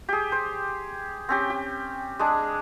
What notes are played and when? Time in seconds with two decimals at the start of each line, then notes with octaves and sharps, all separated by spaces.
0.09 G4 G#4
0.32 C5
1.29 C4 C#4 G4
1.50 G4
2.19 G#3 D4 G#4